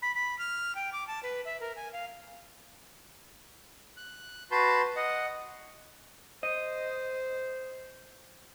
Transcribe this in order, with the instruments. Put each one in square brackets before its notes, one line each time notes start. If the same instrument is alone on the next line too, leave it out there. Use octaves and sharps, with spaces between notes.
[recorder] B5
B5
F6
G5
D6
A5
B4
E5
A#4
G#5
F5
[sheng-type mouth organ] F#6
F#4 B4 A5 C6 G6
D#5 F#5
[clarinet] C5 [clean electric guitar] D#5